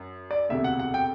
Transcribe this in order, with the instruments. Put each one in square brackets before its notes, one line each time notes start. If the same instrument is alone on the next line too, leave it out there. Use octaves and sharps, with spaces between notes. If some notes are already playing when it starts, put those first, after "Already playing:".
Already playing: [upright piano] F#2
[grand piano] D5
[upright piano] E1 D2 C3 [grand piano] E5
[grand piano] F#5
F#5
G5